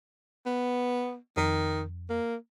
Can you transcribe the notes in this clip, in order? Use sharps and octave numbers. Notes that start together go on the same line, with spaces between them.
B3
F2 D#3
A#3